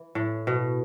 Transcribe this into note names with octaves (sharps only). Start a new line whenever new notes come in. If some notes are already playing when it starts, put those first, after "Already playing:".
Already playing: E3
A2
B2